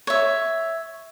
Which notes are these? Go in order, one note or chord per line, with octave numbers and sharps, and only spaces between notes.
C#5 E5